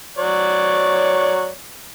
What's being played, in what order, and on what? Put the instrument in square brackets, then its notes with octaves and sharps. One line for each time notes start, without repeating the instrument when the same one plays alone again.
[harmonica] F#3 C#5 D5